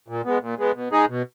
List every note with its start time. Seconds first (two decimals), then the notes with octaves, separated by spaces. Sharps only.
0.08 A#2
0.25 G#3 B3
0.41 A#2
0.58 G#3 B3
0.75 B2
0.92 G#3 D#4 G#4
1.09 B2